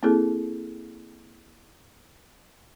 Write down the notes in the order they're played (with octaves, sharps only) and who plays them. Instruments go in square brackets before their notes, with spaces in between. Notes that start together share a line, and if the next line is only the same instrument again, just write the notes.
[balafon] A#3 C4 E4 G#4 A4